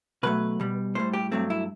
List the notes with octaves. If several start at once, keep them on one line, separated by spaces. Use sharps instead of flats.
B2 F#3 A3 B4
B2 G3
A2 G3 C5
G4
G2 F#3 A3 C4
E4